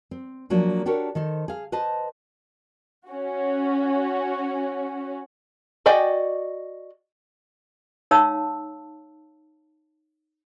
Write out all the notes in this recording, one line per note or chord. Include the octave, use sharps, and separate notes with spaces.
C4
F3 F#3 A#3 D4
D4 F#4 G4 A4 A#4 C#5
D#3 A4 C5
G#4 F5
B4 C5 D#5 A5
C#4 F#4
F#4 D5 D#5 G5 G#5
D#4 C#5 F5 A5 E6